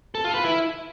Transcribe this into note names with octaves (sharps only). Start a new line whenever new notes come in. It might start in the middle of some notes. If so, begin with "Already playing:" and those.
A4
F4
B4
E4